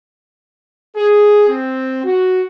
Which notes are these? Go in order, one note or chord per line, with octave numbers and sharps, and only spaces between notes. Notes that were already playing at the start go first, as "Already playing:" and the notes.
G#4
C4
F#4